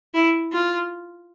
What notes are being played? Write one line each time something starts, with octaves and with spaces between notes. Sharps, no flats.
E4
F4